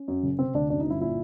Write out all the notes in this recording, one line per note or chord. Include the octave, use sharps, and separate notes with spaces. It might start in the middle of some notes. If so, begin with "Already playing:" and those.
Already playing: C#4
F#2
F#1
C3 C4
D2 D4
F#2 D4
D#4
G1 E4
A#2 E4